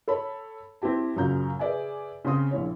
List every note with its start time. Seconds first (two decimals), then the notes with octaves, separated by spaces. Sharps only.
0.08 A4 C#5 A5 B5
0.82 C4 E4 G4 A5
1.16 F#2 A#2 C#3 A#5 G6
1.59 G#4 B4 D5 E5 G#5
2.25 C#3 C4 C6 D#6
2.51 A#1 E4 C#5